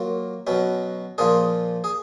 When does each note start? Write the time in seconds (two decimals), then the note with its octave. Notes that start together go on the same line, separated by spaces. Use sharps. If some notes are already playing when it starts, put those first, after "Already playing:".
Already playing: F#3 A#3 F4
0.47 B2 F#3 C#4
1.18 A#2 F3 A#3 F4 G#4
1.84 G#4